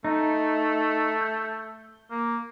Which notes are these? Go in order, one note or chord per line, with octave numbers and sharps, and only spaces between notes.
A3 D#4
G6
A#3